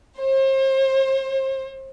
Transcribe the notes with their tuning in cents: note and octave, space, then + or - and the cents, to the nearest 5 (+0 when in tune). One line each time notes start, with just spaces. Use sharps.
C5 +40